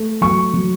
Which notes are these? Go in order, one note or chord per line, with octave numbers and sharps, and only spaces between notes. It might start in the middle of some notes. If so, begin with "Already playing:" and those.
Already playing: A3
F#3 C#6
F#3